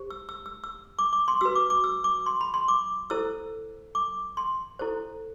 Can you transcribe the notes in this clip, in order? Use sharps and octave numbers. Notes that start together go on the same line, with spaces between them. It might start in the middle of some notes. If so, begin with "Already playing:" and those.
Already playing: G4 C5
E6
E6
E6
E6
D6
D6
C6
F#4 B4 E6
D6
D6
E6
D6
C6
B5
C6
D6
E4 A4 C5 E6
D6
C6
E4 A4 C5